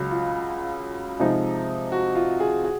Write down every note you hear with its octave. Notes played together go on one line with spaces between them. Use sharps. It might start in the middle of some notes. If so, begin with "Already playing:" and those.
Already playing: C#2 C#3 F#3
F4
C3 F3 G#3 D#4
F#4
F4
G#4
F#4 G#4